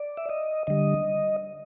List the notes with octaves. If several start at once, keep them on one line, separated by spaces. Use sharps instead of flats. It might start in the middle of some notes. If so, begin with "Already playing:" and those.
Already playing: D5
E5
D#5
D3 G3 D#5